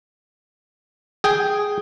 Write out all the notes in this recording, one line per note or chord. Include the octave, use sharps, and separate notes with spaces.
G#4 G5